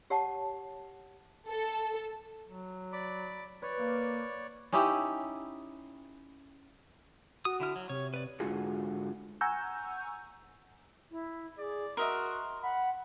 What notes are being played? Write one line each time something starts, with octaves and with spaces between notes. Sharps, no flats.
G4 C#5 F#5 A5 D6
A4
F#3
D5 B5 D6
B4 C#5 D5
A#3 F5
C#4 D#4 E4 G4
F#4 D#6
D3 E4 F6
F#3
C3 C#5
B4 D5
G#2 D3 F4 F#4 G#4
F#5 G#5 A#5 C#6 E6 G6
E4
G#4 D5
F#4 A#4 D#5 E5 C6
F#5 B5